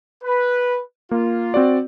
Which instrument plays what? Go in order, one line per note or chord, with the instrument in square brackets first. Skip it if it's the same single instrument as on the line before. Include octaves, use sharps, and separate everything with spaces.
[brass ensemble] B4
[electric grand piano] A#3 [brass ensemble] F4
[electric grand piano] C4 F#4 D5